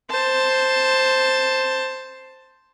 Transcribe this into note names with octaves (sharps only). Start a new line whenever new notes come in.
C5 A5